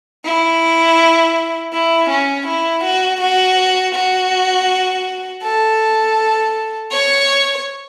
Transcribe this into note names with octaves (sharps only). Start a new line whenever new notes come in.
E4
E4
C#4
E4
F#4
F#4
F#4
A4
C#5